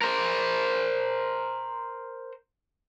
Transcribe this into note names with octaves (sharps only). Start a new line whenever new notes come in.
A#4 C5